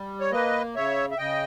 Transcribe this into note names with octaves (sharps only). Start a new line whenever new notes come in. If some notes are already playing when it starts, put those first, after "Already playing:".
Already playing: G3
C#5
A#3 B4 D#5
C#3 C#5 E5
E5
C#3 D#5 G5